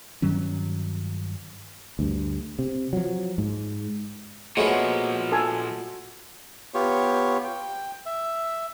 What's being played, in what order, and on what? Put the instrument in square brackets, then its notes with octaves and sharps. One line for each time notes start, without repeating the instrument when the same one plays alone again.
[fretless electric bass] G2 D#3 F#3 C#4
D2 G2
C3
F3 F#3
G#2
[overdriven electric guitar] A#2 F3 [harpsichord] G#3 A3 B3 [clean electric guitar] F#4 C#5
[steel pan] A4 G#5
[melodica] B3 F4 G4 C#5
G5
E5